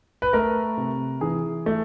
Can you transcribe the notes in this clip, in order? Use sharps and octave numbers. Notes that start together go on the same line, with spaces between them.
B4
A3 A#4
C3
E3 G#4
A3